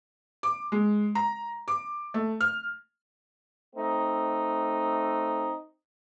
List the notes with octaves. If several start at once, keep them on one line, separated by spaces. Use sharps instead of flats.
D6
G#3
A#5
D6
A3
F6
A3 C4 D#4